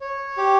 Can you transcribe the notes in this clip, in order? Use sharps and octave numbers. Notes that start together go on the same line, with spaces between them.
C#5
G4